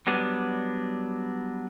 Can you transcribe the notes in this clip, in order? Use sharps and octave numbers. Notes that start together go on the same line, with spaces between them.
F#3 G3 B3 D4